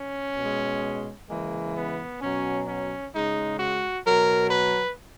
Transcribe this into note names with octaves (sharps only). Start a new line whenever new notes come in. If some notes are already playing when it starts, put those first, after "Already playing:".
Already playing: C#4
B2 G#3
C#3 E3 G#3 A#3
B3
B2 F#3 C#4
C#4
C#3 G#3 D#4
F#4
B2 F#3 A#4
B4